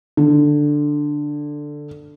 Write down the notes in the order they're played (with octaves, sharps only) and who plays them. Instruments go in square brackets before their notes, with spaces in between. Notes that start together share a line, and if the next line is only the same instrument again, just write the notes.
[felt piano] D3